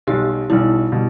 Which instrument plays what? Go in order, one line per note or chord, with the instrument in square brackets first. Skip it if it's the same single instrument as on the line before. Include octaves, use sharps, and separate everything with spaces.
[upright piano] B1 B2 G3 [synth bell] G4
[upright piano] B1 B2 G3 [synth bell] E4
[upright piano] B2 G3